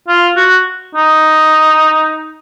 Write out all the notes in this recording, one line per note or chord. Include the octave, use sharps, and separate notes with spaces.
F4
F#4
D#4